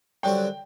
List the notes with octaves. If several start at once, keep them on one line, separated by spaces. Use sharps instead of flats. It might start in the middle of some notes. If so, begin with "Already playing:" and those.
F#2 D3 G3 C4 F#4 G5